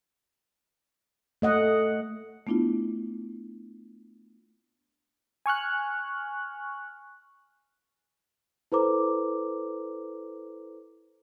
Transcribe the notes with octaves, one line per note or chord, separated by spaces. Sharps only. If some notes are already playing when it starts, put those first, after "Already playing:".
A3 D#5 F#5
A3 B3 D4 E4 F4
G#5 C#6 F6 F#6
E4 A4 B4 C5 A#5 D6